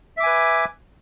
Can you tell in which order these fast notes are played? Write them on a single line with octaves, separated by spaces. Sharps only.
E5 D6 G#5 B4